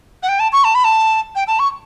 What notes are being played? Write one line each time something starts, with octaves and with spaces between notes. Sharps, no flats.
F#5
G5
A5
C#6
A5
B5
A5
G5
A5
C#6